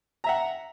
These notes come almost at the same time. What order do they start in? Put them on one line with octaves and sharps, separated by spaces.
A#5 E5 F#5